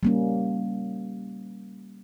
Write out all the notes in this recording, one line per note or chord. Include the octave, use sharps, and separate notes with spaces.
G3 A#3 C#4